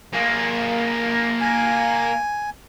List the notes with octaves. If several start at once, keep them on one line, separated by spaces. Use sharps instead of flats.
A#3 G#4
G#5